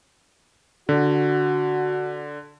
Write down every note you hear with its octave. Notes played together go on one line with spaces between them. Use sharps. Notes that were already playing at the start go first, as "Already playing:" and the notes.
D3 F#4